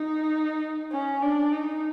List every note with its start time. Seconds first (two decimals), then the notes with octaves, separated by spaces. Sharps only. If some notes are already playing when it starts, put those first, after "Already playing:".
Already playing: D#4
0.91 C#4
1.22 D4
1.52 D#4